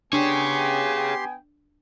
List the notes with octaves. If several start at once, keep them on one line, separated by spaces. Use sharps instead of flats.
B3 D4 G4 G#4 C#5 G5 G#5 C6